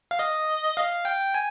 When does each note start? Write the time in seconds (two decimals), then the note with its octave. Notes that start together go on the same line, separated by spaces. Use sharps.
0.11 F5
0.19 D#5
0.77 F5
1.05 G5
1.34 G#5